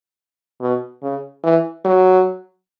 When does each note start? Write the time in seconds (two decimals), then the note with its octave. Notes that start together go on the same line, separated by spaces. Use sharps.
0.61 B2
1.03 C#3
1.44 E3
1.85 F#3